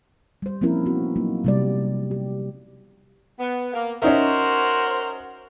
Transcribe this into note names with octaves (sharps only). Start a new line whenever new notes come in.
G3 C5
F3 A#3 C4 C#4 E4 A#4
B3 C4 F#4
F#3 A#3 D#4
C3 G3 D5
G4
B3
A#3
C#4 D#4 F#4 A#4 C5 E5